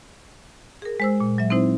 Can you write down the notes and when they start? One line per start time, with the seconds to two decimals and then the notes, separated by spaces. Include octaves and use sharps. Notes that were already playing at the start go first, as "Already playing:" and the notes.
0.82 G#4 A#4
1.00 G#3 C5 E6
1.20 A#2
1.38 F#3 E5
1.50 C4 D#4 E4 C5